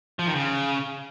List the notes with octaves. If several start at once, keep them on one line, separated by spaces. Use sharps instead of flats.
F3
D#3
C#3